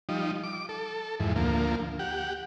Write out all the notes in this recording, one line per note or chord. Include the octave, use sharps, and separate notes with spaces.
F3 G3 D#4
D6
A4
F2 G#2 E3
D2 F3 A#3
G4 F#5